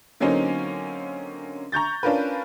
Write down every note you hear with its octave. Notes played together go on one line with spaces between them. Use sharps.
D3 F#3 A#3 C4 C#4 D#4
A#5 C#6 G6 A6
C#4 D4 F4 A#4 B4